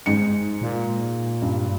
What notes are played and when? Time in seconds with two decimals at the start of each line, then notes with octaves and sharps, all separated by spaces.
0.06 G#2 D#4 C#7
0.62 A#2
1.42 G2